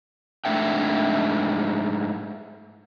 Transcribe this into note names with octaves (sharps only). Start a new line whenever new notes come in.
G#2 A3 D4 E5 G5